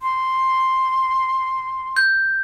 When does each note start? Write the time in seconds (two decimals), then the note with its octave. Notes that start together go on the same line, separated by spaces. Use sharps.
0.01 C6
1.96 G6